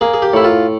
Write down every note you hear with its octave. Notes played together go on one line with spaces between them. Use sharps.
A#3 G#4
G#4
G4
A2 E4
F4